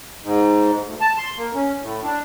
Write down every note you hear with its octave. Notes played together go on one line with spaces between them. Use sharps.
G#2
D2
A5
C6
A#3
C#4
A2
D4